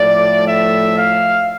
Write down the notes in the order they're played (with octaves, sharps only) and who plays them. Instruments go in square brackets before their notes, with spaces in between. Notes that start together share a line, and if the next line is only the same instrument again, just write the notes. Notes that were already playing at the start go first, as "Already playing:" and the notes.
Already playing: [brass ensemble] A2 F3 A3 D5
E5
F5